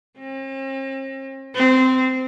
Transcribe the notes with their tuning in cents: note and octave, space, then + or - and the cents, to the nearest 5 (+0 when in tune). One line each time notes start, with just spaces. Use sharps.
C4 +45
C4 -15